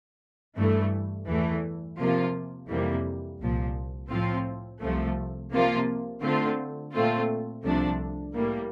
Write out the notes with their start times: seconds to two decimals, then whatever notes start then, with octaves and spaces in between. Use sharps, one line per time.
0.56 G2 E3 A3
1.27 E2 E3 A3
1.98 C3 F3 A#3 F4
2.69 F2 C3 E3 G3 A#3
3.40 C2 A#2 F3
4.10 A2 F3 C4 F4
4.81 C2 C3 F3 A3
5.52 C3 F3 A#3 F4
6.22 D3 A3 C4 F4
6.93 A#2 A3 C4 F4
7.63 C2 C3 F3 A3 D4
8.35 A2 G3 A#3